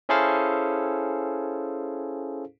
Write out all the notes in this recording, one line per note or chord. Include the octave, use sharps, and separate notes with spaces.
C#4 E4 G#4 A4 C5 F5